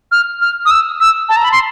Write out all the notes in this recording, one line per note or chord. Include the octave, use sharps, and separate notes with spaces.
F6
F6
D#6
E6
E6
A5
A#5
B5
C6